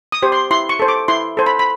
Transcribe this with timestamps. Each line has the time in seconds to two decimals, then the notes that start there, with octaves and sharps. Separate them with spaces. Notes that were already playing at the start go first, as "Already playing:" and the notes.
0.12 D#6
0.22 G4 C5
0.32 C6
0.51 E4 C6
0.69 C#6
0.79 A4 C5
0.88 D6
1.08 E4 C6
1.37 A4 C5
1.46 B5
1.59 B5